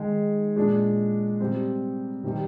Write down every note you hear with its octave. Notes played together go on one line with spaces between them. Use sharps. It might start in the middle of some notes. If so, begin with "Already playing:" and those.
Already playing: D#3 G#3 D#4 G#4
A#2 G#3 D4
C3 G3 C4
C3 D#3 G3